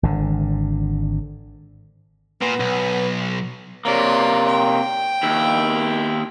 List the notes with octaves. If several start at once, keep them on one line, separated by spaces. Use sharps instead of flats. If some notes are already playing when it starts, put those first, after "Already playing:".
G#1 D3
A#2 B3
B1
C3 A#3 C#5 D5
G5
D#2 E4